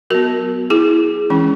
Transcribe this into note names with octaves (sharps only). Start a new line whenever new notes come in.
F#3 B3 F#4 A#4
E4 G#4
E3 G#3 C#4